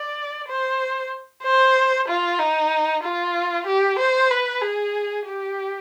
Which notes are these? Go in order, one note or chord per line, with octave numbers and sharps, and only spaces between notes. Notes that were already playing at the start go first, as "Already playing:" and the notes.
Already playing: D5
C5
C5
F4
D#4
F4
G4
C5
B4
G#4
G4